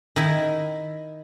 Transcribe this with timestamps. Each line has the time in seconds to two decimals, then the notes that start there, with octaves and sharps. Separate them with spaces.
0.16 D#3 E4